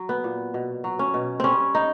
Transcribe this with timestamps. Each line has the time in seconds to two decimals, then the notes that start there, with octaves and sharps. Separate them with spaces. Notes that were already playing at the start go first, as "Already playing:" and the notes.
Already playing: F#3
0.09 B3
0.24 A#2
0.54 B2
0.84 F#3
0.99 C#4
1.14 B2
1.40 G3 C4 C#4
1.75 D#4